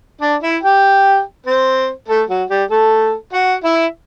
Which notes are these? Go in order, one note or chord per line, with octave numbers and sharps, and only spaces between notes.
D4 D5
E4 E5
G4 G5
C4 C5
A3 A4
F#3 F#4
G3 G4
A3 A4
F#4 F#5
E4 E5